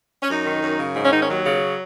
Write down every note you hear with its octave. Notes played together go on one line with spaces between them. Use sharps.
C#4
F#2 D#4
D#3
F#2
C#3
G#2
C#4
D#3 D#4
C#4
D#2 F#3
C#3